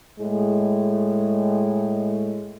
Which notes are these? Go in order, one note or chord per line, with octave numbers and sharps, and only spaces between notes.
A2 G#3